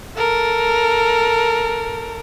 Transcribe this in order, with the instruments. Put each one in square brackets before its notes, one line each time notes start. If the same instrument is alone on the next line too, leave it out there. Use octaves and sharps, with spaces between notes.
[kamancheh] A4 A#4